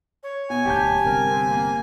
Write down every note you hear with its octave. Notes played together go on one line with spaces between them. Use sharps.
C#5
B2 G#5
D1 D2 G4 A5 G6
G1 C3 A#4
C4
A#3